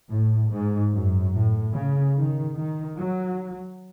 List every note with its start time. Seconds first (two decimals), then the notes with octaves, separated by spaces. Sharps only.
0.11 A2
0.51 G#2
0.93 F#2
1.34 A2
1.74 C#3
2.15 D#3
2.56 D#3
2.98 F#3